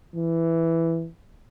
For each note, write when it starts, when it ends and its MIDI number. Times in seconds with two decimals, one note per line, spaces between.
0.15 1.08 52